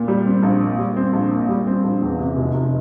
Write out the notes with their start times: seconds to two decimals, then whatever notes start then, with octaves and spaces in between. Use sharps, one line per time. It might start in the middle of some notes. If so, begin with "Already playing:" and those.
Already playing: A#2
0.08 G3
0.26 C4
0.43 A#1
0.61 A#2
0.78 G3
0.96 C4
1.13 A#1
1.31 A#2
1.49 G3
1.67 C4
1.84 A#1
2.01 E2
2.19 C3
2.37 F1
2.54 F1